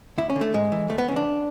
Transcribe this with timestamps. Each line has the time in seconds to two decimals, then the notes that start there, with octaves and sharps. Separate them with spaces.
0.18 D2 E4
0.30 C#4
0.36 D3
0.41 A3
0.54 G#2 G#3
0.72 E3
0.89 D2 A3
0.98 B3
1.08 C#3 C#4
1.11 E3 D4